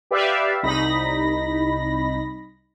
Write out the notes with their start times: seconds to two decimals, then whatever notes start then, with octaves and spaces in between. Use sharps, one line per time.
0.11 G4 B4 D5 E5 F5
0.63 C2 D#4 B5 A#6